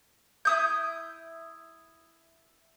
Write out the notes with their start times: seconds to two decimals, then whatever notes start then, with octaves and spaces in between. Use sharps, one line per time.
0.45 E4 D#6 G6